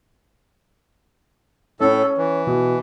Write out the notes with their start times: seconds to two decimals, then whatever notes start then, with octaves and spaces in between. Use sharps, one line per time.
1.80 A2 C#4 A4
2.17 E3
2.47 B2